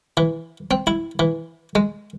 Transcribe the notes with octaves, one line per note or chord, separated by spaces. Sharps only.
E3
C4
E4
E3
G#3